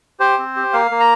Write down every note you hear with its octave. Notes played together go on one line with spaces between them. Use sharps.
G4 C5
C4
G4
A#3 F5
A#3
A#5